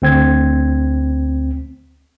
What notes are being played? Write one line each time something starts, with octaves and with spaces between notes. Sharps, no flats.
D2 C4 G#6